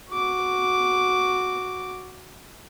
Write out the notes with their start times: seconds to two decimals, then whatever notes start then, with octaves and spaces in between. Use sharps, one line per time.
0.11 F#4 D6